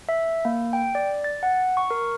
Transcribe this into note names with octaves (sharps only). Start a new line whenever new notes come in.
E5
A#3
G5
D5
A6
F#5
C#6
A#4